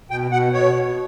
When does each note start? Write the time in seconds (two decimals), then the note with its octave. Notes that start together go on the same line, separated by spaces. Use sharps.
0.10 B2 G5
0.31 B2 F#5
0.53 B2 C#5
0.74 B2